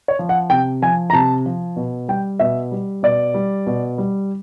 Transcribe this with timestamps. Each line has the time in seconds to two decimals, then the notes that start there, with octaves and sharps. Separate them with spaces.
0.08 C#5
0.19 F3
0.29 F#5
0.50 C3 G5
0.82 F3 G#5
1.10 A#5
1.13 C3 A5
1.46 F3
1.76 B2
2.08 G3 G5
2.39 B2 E5
2.72 G3
3.03 B2 D5
3.34 G3
3.67 B2
3.98 G3